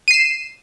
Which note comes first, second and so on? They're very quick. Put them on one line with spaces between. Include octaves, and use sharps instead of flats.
D#7 C7 E7